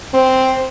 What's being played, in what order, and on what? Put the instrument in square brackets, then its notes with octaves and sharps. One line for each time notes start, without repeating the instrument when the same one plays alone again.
[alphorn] C4